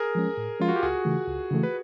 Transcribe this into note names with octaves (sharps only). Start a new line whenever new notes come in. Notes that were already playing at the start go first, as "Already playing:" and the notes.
Already playing: G#4 A#4
F3 G#3 C#4
A2
F3 G#3 C#4 F4
F#4
G4
C#2 F#4 G#4
C#3 E3 A3
C#2
C#3 E3 A3
B4